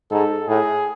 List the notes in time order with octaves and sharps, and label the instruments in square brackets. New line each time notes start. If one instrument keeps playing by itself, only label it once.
[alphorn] G#2 [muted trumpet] A4
[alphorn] A2 [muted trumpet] G#4